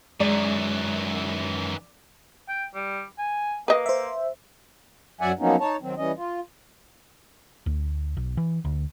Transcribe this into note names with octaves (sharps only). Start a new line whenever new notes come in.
F#2 D#3 E3 G#3 D5
G5
G3
G#5
A#3 B4 D#5
C5 E5
F#2 F#3 D5 E5 F#5 G#5
F3 F#3 A#3 B3 C#4 D#4
D#4 C#5 A5
D#3 F#3 C4
E3 G3 C#4 D#5
F4
D2
B1
E3
D2